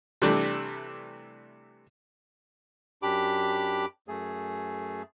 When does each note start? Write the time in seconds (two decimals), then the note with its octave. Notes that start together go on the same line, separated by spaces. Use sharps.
0.22 C3 E3 G3 A3 D4
3.02 F#2 D4 G4 B5 D6
4.08 F#2 A3 G#4